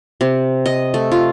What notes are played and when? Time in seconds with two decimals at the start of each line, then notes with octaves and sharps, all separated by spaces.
0.21 C3
0.66 D#5
0.94 A3
1.12 F4